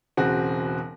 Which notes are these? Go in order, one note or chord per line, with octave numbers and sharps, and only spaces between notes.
E1 C#3 C4 F#4